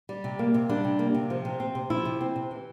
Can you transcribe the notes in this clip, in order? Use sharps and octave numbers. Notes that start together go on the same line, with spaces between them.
G3
C3
A#3
C3
G3 D4
C3
A#3
C3
F3
C3
C4
C3
F3 E4
C3
C4
C3
E3